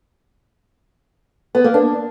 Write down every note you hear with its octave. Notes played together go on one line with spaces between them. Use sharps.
B3
A#3
D4